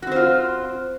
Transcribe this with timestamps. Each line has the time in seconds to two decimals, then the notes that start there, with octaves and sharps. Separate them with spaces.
0.02 F#4
0.07 C4
0.12 C5
0.16 F4